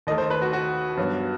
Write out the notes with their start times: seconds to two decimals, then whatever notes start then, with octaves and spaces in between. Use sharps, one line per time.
0.07 D#2 D#3 A3 D#5
0.18 C5
0.30 B4
0.42 F#4
0.53 F#4
0.97 G2 F#3 B3